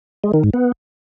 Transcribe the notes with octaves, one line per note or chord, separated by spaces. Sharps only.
G#3
D#3
G#2
B3